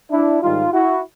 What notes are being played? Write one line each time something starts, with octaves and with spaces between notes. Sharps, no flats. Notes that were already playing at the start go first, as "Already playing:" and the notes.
D4 E4
G#2 D#3 G3 D#4 F4
E4 F#4